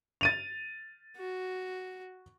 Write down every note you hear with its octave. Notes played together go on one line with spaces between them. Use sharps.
A6 D#7 F7
F#4